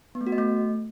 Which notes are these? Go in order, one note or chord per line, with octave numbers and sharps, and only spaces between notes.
B3
A3
F#4
D#5
A3